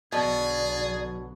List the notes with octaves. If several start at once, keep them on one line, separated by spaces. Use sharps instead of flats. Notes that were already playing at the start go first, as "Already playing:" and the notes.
B1 B2 D3 F#3 G#4 D5